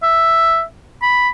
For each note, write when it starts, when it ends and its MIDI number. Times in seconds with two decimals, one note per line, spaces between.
0.03 0.63 76
1.02 1.29 83